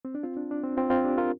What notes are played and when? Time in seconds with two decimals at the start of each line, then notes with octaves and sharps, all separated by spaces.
0.05 C4
0.15 D4
0.23 C4 F4
0.37 D4
0.51 D4
0.64 C4
0.77 C4 F4
0.90 C4 F4
1.05 D4 G4
1.18 F4 A#4